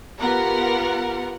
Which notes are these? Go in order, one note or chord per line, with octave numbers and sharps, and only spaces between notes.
B3 F4 G4 A#4 F#5